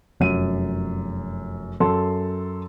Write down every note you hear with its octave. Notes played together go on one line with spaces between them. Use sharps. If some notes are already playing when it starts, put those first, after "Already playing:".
F1 F#2 D#7
F#2 A4 C6